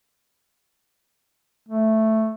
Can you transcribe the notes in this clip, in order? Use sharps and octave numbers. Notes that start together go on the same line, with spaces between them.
A3